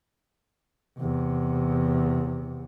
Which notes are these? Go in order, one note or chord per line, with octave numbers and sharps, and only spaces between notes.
E2 C3